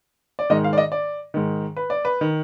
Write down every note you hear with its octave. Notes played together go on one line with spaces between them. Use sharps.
D5
G#2 D#3 D#5
F5
D5
D#5
D5
G#2 D#3
B4
D5
B4
D#3